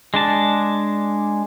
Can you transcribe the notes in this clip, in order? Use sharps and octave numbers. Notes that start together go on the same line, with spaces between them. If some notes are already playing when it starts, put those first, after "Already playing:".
G#3 D4 A5